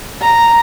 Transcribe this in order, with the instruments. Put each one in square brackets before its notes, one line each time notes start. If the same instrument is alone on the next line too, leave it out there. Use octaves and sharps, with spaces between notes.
[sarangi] A#5